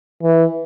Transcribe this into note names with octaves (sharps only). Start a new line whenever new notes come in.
E3